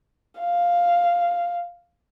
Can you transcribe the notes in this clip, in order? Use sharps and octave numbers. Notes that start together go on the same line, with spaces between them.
F5